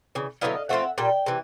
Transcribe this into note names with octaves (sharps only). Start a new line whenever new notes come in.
C#3 E3
D3 F#3 B3 E4 D#5 F5
F3 A3 C4 F4 E5 F#5
A#2 G3 G5
C3 E3